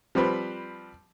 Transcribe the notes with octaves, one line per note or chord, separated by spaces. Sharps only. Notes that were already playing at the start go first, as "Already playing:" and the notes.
F3 G3 C4 B4